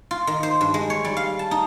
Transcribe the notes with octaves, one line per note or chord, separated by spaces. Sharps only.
F4
D#3
C5
G2
G#3
C#5
G3
F5
A5
D#4